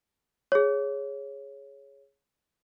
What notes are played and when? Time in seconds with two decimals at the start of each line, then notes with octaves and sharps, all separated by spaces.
0.52 G#4 C#5